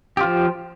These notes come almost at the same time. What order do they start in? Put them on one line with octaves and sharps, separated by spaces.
G4 F4 F3